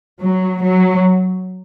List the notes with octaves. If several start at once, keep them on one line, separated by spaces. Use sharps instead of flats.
F#3
F#3